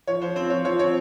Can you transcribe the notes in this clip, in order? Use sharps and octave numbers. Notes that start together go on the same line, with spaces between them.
F3 C#5
F3 C5
C4 C5
F3 C#5
F3 C#5
C4 C#5